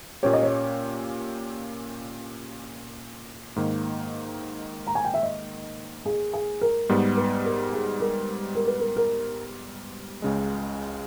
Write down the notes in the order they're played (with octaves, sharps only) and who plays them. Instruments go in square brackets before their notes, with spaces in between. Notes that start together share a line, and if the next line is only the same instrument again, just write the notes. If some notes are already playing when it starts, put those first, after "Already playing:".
[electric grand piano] A#2 A#3 C#4 G4 [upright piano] C#5
[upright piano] D#5
C#5
[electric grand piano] G#2 D#3 A#3
[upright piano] A#5
G#5
G5
E5
D#5
G#4
G#4
A#4
[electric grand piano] G#2 G3 B3
[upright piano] B4
A#4
G#4
A#4
A#4
B4
A#4
A#4
[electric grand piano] C#2 C#3 G#3